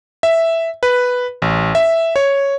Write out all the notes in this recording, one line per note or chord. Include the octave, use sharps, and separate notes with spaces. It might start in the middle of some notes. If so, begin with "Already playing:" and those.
E5
B4
A1
E5
C#5